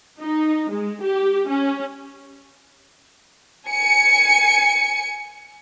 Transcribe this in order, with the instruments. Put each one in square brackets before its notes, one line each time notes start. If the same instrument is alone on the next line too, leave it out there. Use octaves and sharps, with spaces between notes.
[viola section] D#4
G#3
G4
C#4
[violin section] G#5 C#7